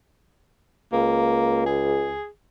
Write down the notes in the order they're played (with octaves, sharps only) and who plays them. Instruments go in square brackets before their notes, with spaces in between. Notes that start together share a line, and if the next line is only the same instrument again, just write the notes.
[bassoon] C#2 [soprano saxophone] A#3
[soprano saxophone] G#4